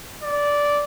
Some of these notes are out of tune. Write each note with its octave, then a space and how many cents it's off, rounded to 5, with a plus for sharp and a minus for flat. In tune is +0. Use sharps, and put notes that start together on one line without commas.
D5 -10